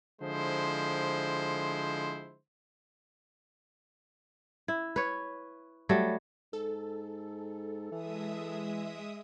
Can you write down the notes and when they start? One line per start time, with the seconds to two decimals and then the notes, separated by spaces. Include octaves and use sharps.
0.22 D3 F3 G#3 E4 C5
4.68 E4
4.96 B4 C#5
5.89 F#3 G3 A3
6.53 G#2 A4
7.92 E3 G#3 E5 D#6